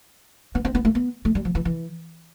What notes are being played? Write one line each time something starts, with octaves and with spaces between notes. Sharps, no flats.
B3
C4
B3
A3
B3
A3
G3
F3
E3
E3